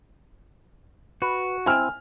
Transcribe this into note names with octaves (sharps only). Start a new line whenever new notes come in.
F#4 B4
C4 E4 G#5 F6